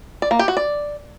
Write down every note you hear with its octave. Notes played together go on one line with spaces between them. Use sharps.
D5
A#3
G4
F#4
D5